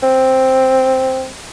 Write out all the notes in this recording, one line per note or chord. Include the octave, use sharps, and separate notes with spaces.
C4